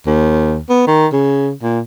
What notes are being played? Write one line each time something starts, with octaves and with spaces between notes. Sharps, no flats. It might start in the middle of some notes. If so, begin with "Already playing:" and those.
D#2
B3
D#3
C#3
A#2